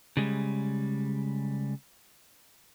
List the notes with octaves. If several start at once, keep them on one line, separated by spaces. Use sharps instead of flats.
C#3 G3 G#3